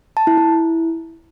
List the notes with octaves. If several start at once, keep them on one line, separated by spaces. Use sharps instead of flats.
A5
E4
E4